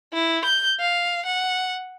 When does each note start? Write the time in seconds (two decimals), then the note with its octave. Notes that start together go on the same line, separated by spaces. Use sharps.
0.13 E4
0.45 G6
0.80 F5
1.25 F#5